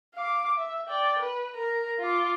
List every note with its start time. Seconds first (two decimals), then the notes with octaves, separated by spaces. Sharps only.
0.15 F5 D6
0.57 E5
0.88 D5 G5
1.19 B4
1.55 A#4 A#5
2.00 F4 D6